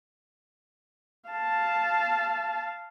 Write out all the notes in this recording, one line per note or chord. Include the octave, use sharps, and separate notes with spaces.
F5 A5